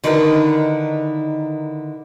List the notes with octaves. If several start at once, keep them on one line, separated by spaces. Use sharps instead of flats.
D3 D#3 D#4 E4 A#4 B4